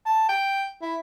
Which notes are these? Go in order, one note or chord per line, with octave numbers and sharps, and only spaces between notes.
A5
G5
E4